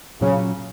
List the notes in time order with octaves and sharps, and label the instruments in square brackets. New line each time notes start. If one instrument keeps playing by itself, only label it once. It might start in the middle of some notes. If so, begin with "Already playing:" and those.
[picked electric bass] A#2 F#3 C#4 [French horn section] C#3